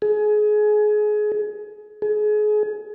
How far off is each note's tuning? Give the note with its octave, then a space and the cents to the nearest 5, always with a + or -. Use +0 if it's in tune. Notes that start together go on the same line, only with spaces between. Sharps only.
G#4 +25
G#4 +30